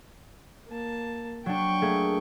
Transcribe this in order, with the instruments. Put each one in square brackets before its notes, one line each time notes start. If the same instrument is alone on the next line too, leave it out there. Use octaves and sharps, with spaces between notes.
[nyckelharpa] A#3 A5
[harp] F#3 D4 [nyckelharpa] G5 C#6
[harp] A3 A#3 G#4